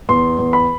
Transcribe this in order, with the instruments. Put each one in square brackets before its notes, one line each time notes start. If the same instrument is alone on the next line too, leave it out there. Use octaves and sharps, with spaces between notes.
[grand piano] E2 C6
E2
B5